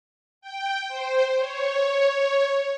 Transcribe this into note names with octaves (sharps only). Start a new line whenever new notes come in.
G5
C5
C#5